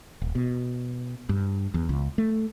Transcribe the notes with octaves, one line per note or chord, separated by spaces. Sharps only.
D#1
B2
G2
E2
C#2
A3